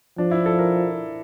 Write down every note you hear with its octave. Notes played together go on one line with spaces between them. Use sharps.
F3 D4
E4
A4
A#4